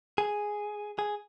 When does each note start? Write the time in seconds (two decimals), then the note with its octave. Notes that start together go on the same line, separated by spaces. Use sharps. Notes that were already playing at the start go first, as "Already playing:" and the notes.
0.18 G#4
0.99 G#4